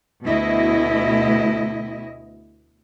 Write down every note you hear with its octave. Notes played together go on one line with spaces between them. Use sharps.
D2 B2 E4 D#5